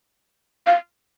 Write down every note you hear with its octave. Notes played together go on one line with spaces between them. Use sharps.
F5